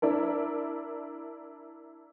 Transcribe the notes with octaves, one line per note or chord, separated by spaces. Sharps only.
D4 E4 A#4